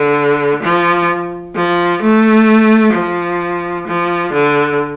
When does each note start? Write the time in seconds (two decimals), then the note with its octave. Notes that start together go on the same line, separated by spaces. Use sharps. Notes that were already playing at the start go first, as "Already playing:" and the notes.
Already playing: D3
0.63 F3
1.55 F3
2.02 A3
2.94 F3
3.87 F3
4.33 D3